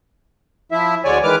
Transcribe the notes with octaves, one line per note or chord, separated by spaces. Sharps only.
F3 E4 E5
D2 D3 G#3 C#5 D5 G#5
D#3 E3 G#3 B4 D6 F6